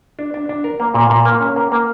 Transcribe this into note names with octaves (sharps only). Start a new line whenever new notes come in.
D4
D4
D4
A#4
A#3
A#2
A#2
A#3
C#4
A#3
A#3